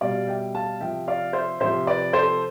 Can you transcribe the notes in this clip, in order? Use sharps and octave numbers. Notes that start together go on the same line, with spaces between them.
B2 G3 D5 F5
E5 G5
F5 A5
C3 F3 E5 G5
D5 F5
C5 E5
C3 F3 C5 E5
B4 D5
A4 C5